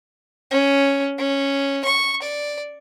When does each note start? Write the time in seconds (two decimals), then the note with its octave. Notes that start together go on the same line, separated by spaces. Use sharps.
0.51 C#4
1.18 C#4
1.85 C#6
2.22 D5